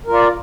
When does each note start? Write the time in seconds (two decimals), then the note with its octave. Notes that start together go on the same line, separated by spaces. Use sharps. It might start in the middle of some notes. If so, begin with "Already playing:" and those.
0.06 A#4
0.10 F4
0.13 D5